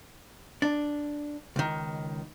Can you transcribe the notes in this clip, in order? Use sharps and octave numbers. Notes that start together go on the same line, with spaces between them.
D4
C#2 D#3